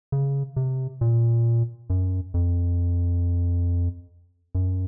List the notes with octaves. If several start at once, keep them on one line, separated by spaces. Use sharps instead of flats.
C#3
C3
A#2
F#2
F2
F#2